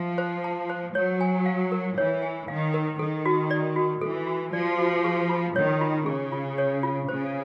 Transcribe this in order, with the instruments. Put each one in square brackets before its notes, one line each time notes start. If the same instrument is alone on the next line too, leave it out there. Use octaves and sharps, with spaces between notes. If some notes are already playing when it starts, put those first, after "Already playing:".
Already playing: [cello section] F3 [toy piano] E5
[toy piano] C5
A5
C5
[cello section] F#3 [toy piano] C#5
[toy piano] G#5
F5
A#4
[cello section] E3 [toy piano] C#5
[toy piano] G#5
[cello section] D#3 [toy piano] F5
[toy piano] A#4
[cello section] D#3 [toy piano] A4
[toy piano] F#4
D5
F#4
[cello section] E3 [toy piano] A4
[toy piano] F#4
[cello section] F3 [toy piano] D5
[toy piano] F#4
G#4
F4
[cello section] D#3 [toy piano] C#5
[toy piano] F4
[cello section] C#3 [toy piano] G#4
[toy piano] F4
C#5
F4
[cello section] C#3 [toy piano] C5